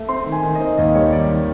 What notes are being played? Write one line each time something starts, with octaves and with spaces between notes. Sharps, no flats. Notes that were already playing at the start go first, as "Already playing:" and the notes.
Already playing: A3
C4 C6
D#3
G#5
D#3
C4 D#5
D#2 D#5
G3 C#5
D#3 D5
D#3